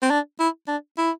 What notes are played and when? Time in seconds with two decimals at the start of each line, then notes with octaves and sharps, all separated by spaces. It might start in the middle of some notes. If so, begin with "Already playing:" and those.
0.02 C4
0.10 D4
0.39 E4
0.68 D4
0.98 E4